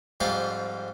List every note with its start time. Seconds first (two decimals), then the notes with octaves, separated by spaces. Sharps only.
0.20 F2 G#2 G3 F4 F5 D6